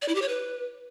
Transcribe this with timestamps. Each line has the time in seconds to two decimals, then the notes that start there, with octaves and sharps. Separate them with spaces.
0.02 D5
0.09 E4
0.15 G4
0.22 C#5
0.28 B4